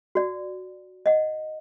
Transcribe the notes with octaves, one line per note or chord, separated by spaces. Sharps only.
F#4 D5
D#5 F#5